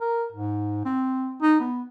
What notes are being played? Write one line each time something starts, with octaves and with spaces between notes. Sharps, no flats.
A#4
G#2
C4
D#4
B3